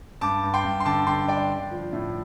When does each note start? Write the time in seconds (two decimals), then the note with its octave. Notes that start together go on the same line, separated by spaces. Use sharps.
0.21 G2 A5 D6
0.43 G2
0.54 G5 C6
0.64 G2
0.80 C6
0.85 D3 A5 D6
1.07 D3 G5 C6
1.28 G3 D5 G5
1.50 D4
1.71 F3
1.93 A2